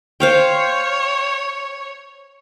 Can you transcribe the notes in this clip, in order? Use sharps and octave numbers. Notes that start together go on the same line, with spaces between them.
C5 C#5 F5 G5